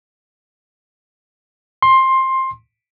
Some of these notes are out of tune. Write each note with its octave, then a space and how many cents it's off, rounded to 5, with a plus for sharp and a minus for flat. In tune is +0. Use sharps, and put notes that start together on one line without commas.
C6 +15